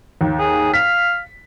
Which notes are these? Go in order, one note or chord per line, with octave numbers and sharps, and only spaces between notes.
D#2
G#4
F5 B6